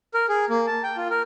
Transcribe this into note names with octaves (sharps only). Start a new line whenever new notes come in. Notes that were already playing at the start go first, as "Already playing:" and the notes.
A#4
G#4
A#3
A5
G5
F4
A#4